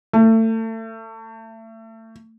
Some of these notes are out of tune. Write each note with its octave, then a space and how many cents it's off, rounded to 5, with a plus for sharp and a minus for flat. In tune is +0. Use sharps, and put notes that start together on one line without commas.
A3 +30